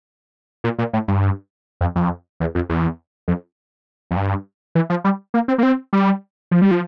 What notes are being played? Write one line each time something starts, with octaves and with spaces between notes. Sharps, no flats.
A#2
A#2
A2
G2
F2
F2
E2
F2
E2
F2
F2
G2
E3
F3
G3
A#3
C4
A#3
C4
G3
F3
G3
F3